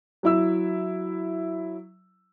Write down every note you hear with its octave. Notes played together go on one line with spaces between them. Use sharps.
F#3 E4 E6